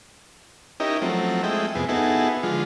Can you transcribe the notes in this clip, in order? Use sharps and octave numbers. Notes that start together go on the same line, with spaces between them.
C#4 D#4 E4 G4 A#4 D#5
F3 F#3 A3 C4
G#3 A3 E4 D#5 G5
F2 C3 B3 G#4
B3 D#4 E4 F#4 G#4 A4
D3 F3 G#3 F4